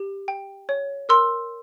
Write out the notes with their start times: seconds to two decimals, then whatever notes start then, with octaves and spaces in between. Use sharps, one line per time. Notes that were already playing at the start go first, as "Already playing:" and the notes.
Already playing: G4
0.28 G5
0.69 C#5
1.09 A#4 C6 E6